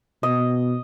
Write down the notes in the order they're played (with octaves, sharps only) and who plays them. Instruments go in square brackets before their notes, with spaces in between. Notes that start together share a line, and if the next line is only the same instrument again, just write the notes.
[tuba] B2 [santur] D#5